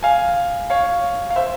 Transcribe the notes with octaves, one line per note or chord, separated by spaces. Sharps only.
F5 G#5
C#5 F5
F5
C5 E5